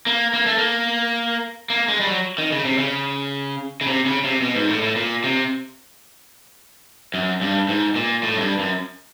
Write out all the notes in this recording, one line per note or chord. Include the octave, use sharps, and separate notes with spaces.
A#3
A#3
A3
A#3
A#3
G#3
G3
F#3
D#3
C#3
C3
C#3
C#3
C3
C#3
C3
B2
G#2
A2
A2
A#2
C3
F#2
G2
G#2
A#2
A2
F#2
G2
F#2